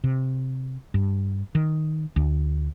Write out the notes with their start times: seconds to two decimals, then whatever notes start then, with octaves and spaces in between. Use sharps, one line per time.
0.04 C3
0.94 G2
1.55 D#3
2.16 D2